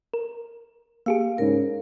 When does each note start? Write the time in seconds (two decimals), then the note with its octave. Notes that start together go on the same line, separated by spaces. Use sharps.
0.14 A#4
1.06 A#3 G4 G#4 F5
1.38 G#2 C#3 A#4